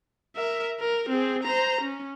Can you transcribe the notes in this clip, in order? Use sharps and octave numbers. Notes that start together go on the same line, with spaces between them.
A#4 E5
A#4
C4 G#4
C5 A#5
C#4